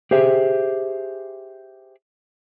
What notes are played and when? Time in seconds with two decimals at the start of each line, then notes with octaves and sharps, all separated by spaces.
0.11 G4 G#4 C5 E5